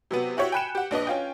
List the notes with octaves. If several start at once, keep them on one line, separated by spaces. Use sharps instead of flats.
C3 F#3 B3
E4 F#4 G4 C#5 E5 F#5
G5 G#5 B5 F#6 C#7 E7
G4 F#5
A#1 D4 B4 D#5
C#4 F4 G5